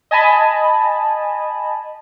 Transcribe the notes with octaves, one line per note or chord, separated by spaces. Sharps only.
D#5 G#5 A5 B5